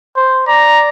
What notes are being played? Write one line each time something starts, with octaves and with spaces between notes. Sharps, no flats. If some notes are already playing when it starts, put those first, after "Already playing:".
C5
D5 A#5